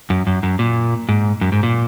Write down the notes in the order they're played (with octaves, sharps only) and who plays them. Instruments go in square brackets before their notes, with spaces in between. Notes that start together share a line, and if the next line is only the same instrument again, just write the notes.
[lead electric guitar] F#2
F#2
F#2
A#2
G#2
F#2
G#2
A#2